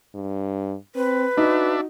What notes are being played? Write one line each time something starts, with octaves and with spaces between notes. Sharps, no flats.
G2
C4 B4
D4 D#4 F#4 E5